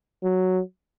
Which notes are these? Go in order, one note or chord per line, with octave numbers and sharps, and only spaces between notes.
F#3